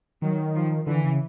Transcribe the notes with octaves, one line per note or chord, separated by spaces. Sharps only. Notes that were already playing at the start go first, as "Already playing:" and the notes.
D#3 F#3
F3
D3 E3
C#3